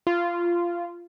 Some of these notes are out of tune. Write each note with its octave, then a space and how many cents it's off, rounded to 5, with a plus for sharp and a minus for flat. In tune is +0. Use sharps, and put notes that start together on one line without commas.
F4 -15